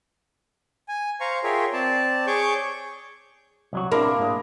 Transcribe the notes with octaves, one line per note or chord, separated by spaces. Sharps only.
G#5
C5 F5 A#5 C#6
F4 G#4 A#4 C#5 E5 G5
C4 D5 A5
G#4 C#5 C#6 D6 G6
C2 F#3 F#4
C3 A#3 D4 E4
G#2 G#3